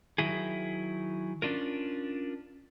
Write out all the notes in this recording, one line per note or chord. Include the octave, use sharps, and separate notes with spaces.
D#3 F#3 E4 G#4
C#4 D4 F4 A#4